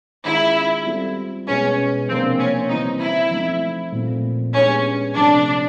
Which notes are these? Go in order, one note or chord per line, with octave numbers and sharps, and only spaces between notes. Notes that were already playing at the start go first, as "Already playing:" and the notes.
D#3 G#3 C#4 E4 F4
G3 C4 F4 A4
B2 G#3 B3 C#4
C3 F3 A#3 C4 D4
C#4
C#3 E3 G3 C4 D#4
E4
F3 A3 C4 D#4
A#2 F3 A3 C4 F4
G#3 B3 C#4 D4 G4
C3 F3 A3 C#4 D4